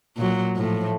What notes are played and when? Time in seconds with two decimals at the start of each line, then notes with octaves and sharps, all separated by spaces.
0.16 A#2 F#3
0.55 A2 F3